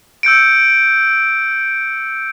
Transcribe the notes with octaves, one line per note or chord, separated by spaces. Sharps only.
E6 G6 C#7 D7